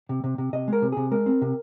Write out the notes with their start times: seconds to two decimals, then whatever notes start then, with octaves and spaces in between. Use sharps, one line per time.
0.09 C3
0.24 C3
0.38 C3
0.53 C3 D#5
0.68 G#3 A#4
0.82 C3
0.92 C3 G#4
1.11 G#3 A#4
1.26 C4
1.42 C3